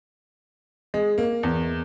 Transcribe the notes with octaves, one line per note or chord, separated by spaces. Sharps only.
G#3
A#3
E2